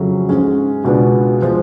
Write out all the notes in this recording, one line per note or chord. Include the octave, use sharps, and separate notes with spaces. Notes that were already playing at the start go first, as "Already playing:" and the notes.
Already playing: F2 C#3 F#3 A3 C#4
G#2 G#3 C#4
C#2 B2 G#3 B3 D4
F3 G#3